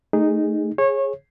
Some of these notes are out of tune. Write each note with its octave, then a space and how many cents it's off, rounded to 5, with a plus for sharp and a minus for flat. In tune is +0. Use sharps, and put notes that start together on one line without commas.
A3 +0 D#4 -5 G#4 -20
G#4 +0 C#5 -25